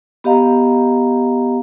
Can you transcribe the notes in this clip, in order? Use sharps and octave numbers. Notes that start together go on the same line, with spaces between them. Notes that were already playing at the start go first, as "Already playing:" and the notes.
B3 G4 D#5 F5 A#5